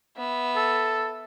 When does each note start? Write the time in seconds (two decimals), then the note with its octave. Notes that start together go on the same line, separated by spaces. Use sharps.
0.17 B3 E5
0.56 A4